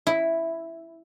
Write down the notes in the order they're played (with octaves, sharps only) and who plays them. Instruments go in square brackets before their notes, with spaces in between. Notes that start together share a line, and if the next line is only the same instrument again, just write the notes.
[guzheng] E4